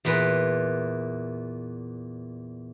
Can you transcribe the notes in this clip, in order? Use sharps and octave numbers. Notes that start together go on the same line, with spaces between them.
E2 A#2 B4